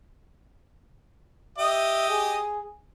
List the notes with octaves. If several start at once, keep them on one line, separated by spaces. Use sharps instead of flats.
G4 D#5 E5 D#6
G#4